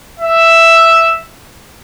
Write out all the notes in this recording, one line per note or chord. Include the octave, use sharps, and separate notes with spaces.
E5